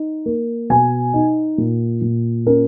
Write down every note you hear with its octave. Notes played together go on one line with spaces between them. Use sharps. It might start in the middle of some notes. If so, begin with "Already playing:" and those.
Already playing: D#4
A#3
B2 G#5
D#4
A#2
A#2
C#4 A#4